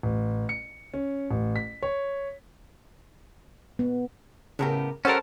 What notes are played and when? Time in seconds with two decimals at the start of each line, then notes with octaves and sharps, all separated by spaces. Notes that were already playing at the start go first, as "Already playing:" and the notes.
0.03 A1
0.49 C#7
0.94 C#4
1.31 A1
1.56 B6
1.83 C#5
3.79 B3
4.59 A2 C#3 B3 G4 A#4
5.05 G3 C#4 A4 A#4 C5 F#5 A5